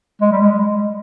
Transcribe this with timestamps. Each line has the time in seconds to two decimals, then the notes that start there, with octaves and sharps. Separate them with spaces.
0.21 G#3
0.31 G3
0.41 G#3